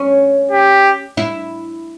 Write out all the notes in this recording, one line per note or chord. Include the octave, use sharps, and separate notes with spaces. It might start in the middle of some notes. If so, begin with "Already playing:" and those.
Already playing: C#4
G4
E4